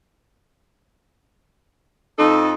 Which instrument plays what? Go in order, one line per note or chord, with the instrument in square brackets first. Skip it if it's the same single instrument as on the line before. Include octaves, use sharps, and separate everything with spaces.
[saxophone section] F2 A4 [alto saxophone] D#4